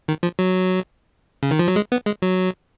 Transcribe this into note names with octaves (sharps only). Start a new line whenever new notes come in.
D#3
F3
F#3
C#3
D#3
F3
F#3
G#3
B3
G#3
F#3